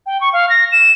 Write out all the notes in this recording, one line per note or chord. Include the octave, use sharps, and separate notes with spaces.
G5
C#6
F5
A#6
E7